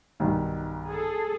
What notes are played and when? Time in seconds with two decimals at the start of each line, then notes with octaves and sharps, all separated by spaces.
0.20 B1 G2 D#3
0.88 G#4 A4